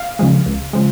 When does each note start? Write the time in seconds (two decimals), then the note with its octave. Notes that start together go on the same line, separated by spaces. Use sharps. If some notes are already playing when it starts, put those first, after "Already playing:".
Already playing: F5
0.19 C#3 F3 G#3
0.46 C#2
0.73 C#3 F3 G#3